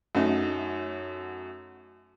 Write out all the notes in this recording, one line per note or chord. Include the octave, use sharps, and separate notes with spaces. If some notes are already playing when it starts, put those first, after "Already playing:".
F#2 F#3 A3 D#4